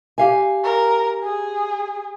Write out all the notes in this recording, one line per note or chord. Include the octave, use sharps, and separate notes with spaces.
G4 F5 G#5
A#4
G#4